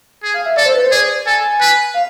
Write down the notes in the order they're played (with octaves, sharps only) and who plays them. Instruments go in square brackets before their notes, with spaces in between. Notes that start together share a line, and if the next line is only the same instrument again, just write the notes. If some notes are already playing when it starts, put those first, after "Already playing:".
[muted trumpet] G#4
[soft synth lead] F5
E5
[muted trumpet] A4 [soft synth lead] D5
[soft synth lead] C5
B4
C5
[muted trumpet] G#4 [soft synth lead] D5
[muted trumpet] A4 [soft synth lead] G#5
[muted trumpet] B4
[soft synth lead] F5